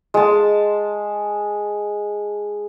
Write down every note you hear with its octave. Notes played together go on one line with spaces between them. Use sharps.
G#3 A5